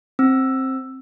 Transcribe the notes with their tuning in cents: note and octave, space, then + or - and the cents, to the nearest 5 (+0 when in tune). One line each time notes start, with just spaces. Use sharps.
C4 +10 E6 +5